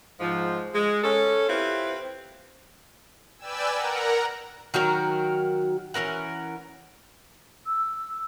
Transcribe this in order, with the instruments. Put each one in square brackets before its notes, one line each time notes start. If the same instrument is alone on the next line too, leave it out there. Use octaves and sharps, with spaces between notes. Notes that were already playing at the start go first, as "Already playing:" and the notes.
[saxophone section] G#2 F3
G#3
C#4 A4
C4 E4 F4 G4 B4
[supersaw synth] B4 D5 G5 G#5 E6
A#4 F#5 A#5
[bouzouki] D#3 F#3 F#4 A#4
E3 C#4 A#4 F#5
[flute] E6